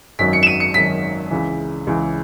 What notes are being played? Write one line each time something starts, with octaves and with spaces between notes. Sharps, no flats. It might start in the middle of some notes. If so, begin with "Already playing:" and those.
G#1 F#2 D#3 F#3 B6
C#7
E7
D#7
C#7
G#1 F#2 D#3 F#3 B6
C#2 C#3 E3
C#2 C#3 E3